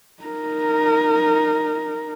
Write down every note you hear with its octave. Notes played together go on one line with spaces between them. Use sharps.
D#4 A#4